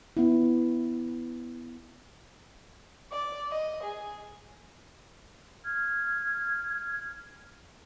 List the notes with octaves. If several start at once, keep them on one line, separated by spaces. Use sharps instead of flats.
B3 E4
D5
D#5
G#4
F6 G#6